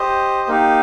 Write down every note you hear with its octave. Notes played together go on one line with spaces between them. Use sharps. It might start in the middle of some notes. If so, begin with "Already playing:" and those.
Already playing: G4 C5 D#5
A#3 D#4 G4